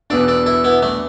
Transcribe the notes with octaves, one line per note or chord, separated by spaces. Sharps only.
E2 B2 B3 D4 A4 D5
A4 D5
E4 A4
B3 E4
A3 D4